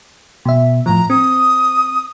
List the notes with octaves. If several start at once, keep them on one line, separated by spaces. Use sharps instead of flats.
B2 E5
A2 F3 A#5
C4 D#6